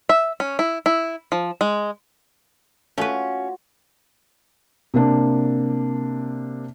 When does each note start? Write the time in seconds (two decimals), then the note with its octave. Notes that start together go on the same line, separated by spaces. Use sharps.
0.09 E5
0.40 C#4
0.59 E4
0.86 E4
1.32 F3
1.61 G#3
2.98 A3 C#4 F4 F#4 B4
4.94 C3 A#3 D4